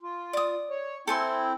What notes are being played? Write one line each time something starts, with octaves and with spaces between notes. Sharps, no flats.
F4
D5 D#6
C#5
C4 E4 A4 G5 G#5 C6